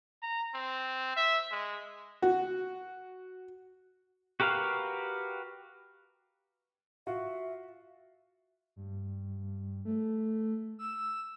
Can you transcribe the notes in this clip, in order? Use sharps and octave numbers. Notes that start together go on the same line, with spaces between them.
A#5
C4
E5
G#3
F#4
F#4 G4 A#4 B4 F5
F4 F#4 E5
G2
A3
E6